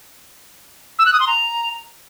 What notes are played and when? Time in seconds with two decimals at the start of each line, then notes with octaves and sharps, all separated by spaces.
0.99 E6
1.06 F#6
1.13 D#6
1.20 C6
1.27 A#5